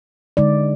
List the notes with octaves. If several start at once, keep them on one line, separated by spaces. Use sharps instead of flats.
D3 G#3 D#4 D5